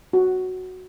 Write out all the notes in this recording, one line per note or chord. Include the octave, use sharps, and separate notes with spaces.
F#4